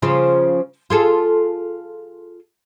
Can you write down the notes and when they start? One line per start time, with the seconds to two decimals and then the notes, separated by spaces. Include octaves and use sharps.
0.02 C#3 F3 F4
0.90 F4 G#4 A4